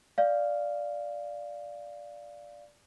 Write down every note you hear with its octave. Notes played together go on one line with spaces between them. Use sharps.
D5 F5